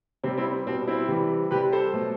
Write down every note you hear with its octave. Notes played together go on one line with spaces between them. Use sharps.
C3 G3 C4
C4 E4
C4
B2 G3 C4
C4 E4
C3 E3 G3
C3 G3 G4 B4
A4 C5
B2 F#3 A3